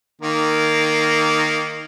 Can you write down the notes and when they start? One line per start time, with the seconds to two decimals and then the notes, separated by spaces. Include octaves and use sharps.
0.21 D#3 A#3